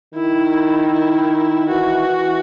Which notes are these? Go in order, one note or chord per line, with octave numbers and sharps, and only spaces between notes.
D#3 E4
E4
E3 F#4
E3